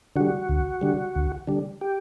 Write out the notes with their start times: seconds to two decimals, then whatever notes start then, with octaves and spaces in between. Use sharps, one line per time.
0.16 D3 G3 F#4
0.49 D2
0.81 D3 G3
1.16 D2
1.47 D3 G3
1.81 G4